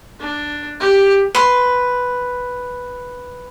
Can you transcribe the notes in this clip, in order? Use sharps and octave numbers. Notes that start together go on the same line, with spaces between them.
D4
G4
B4 C6